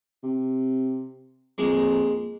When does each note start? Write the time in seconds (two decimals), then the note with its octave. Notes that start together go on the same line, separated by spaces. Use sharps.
0.23 C3
1.58 F2 G#3 A#3